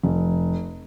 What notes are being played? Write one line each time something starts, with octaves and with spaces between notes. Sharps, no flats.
F1